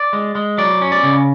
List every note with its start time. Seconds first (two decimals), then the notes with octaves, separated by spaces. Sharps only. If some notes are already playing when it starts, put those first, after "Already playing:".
Already playing: D5
0.13 G#3
0.35 G#3
0.58 F#3 D5
0.82 C#4
0.92 D5
1.03 C#3